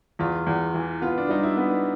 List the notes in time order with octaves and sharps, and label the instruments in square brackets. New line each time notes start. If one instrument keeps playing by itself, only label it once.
[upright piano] E2 [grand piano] F4
[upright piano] E2
E3
[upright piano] B3 [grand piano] F4
[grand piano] D4
[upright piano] G3 [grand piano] D#4
[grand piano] E4
[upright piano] B3